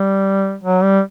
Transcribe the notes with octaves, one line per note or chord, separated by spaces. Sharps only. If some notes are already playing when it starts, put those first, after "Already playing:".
Already playing: G3
F#3
G3